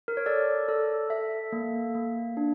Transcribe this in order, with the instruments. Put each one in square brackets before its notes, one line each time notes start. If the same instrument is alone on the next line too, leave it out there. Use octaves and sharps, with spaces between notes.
[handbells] A#4
C#5
A4 D5
A4
A4 E5
A#3
A#3
D4